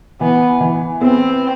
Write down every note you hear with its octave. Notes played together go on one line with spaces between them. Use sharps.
E3 B3
E3
B3 C4